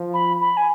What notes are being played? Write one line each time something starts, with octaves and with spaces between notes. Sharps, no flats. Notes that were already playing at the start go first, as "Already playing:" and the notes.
Already playing: F3
B5
B5
G#5